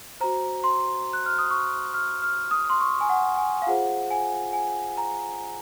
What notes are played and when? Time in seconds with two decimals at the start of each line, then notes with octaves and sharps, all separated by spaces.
0.21 F#4 C5 A#5
0.64 C6
1.13 F#6
1.26 F6
1.38 D#6
1.51 C#6
1.94 F6
2.22 F6
2.51 D#6
2.70 C6
2.81 C#6
3.01 G#5
3.09 F#5
3.38 G#5
3.62 F5
3.67 F4 G#4 C5 F#5
4.11 G#5
4.53 G#5
4.98 A#5